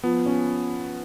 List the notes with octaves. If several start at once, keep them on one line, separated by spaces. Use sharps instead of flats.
F3 B3
C#4